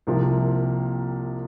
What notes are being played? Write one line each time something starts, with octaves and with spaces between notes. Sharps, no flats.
C2 C3 F3 A#3